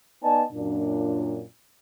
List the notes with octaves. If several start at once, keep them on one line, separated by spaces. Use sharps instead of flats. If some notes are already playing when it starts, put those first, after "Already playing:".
B3 D#4 D5 D#5 G#5 A5
F#2 A#2 D4